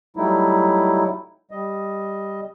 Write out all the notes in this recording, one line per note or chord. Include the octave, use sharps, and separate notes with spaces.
F#3 G3 A3 D#4 E4
G3 D#5